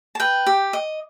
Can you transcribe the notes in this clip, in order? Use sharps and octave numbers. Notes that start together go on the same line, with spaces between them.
A5
B4 G5
G4
D#5